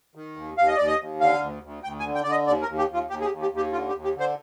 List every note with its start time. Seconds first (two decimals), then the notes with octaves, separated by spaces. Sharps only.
0.15 D#3
0.36 D#2
0.57 D#2 F5
0.67 D#5
0.77 D#2 D5
0.87 D#5
0.99 D#2
1.20 D3 F5
1.42 D2
1.63 D2
1.83 D2 G5
2.00 G#5
2.04 D3
2.15 G5
2.23 D3 D5
2.31 D#5
2.47 D#2 D5
2.62 A#4
2.68 D#2
2.78 G4
2.89 D#2 F4
3.10 D#2 G4
3.21 G#4
3.25 G4
3.31 D#2
3.42 G4
3.51 D#2
3.56 G4
3.72 D3 F4
3.89 G4
3.94 D#2
4.04 G4
4.15 D3
4.20 C5